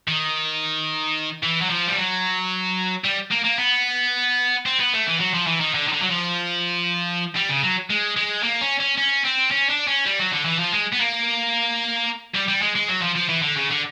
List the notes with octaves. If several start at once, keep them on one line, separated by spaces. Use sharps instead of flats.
D#3
E3
F#3
F3
G3
F#3
G3
A#3
A#3
B3
C4
B3
A3
E3
F#3
F3
E3
D#3
D3
D#3
D3
F#3
F3
G3
C#3
F#3
G#3
G#3
A#3
C#4
C#4
C#4
C4
C#4
D4
C#4
G3
F#3
D3
E3
F3
G#3
B3
A#3
G3
G3
G#3
G#3
F#3
F3
F3
E3
D3
C#3
D3